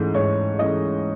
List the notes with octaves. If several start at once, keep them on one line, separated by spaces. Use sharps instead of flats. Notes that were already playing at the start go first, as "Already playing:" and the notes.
Already playing: G#2 E3 A3 C#4
G#2 C#5
E3 A3 C#4 D#5